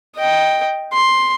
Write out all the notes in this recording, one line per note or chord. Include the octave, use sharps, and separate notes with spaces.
D#5 G5
C6